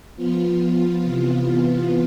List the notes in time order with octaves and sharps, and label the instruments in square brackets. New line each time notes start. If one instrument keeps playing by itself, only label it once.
[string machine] F3 B3 F4
C3 E3 B3 F4